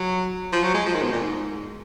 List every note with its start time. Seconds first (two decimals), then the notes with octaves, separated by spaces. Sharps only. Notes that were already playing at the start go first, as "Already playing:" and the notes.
Already playing: F#3
0.52 F3
0.63 F#3
0.74 G#3
0.86 F3
0.95 D#3
1.03 B2
1.12 A#2
1.20 G#2